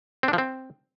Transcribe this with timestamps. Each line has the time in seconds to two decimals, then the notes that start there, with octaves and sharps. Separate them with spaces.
0.23 C4
0.28 D4
0.33 F3
0.38 C4